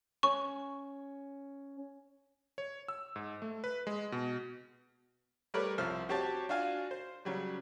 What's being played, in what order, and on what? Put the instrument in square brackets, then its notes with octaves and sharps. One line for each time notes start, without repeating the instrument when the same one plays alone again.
[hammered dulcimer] C#4 [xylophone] C#6
[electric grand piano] C#5
E6
G#2
A3
B4
G#3
B2
[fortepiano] G3 A3 A#4 B4 C#5 D5
C2 F3 C5 F6
C4 F#4 G4 C#5 A5
D4 F4 F#4 F5 G#5
C5
C#3 F#3 G3